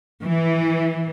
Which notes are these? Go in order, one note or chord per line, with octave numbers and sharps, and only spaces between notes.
E3